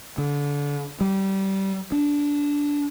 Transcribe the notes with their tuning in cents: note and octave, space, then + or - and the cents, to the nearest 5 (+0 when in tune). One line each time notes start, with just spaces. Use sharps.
D3 -30
G3 -20
D4 -15